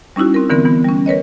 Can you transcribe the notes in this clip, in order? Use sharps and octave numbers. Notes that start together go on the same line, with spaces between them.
G3 C#4 D#4 E4 F#4
C4 A#4
D3 E3 B3 C4 A#4
E3 B3
G3 C#4
A#4 B4 C#5 D#5